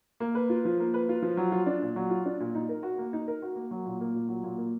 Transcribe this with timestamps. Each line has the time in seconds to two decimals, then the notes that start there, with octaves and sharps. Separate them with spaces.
0.20 A#3
0.35 B4
0.50 F4
0.65 F3
0.80 A#3
0.94 B4
1.09 F4
1.22 F3
1.37 F#3
1.52 F4
1.66 D4
1.82 A#2
1.96 F#3
2.10 F4
2.26 D4
2.40 A#2
2.55 D#4
2.69 A#4
2.83 F#4
2.98 A#3
3.13 D#4
3.28 A#4
3.42 F#4
3.56 A#3
3.71 F#3
3.86 A#2
4.01 A#3
4.14 A#2
4.29 F#3
4.44 A#2
4.58 A#3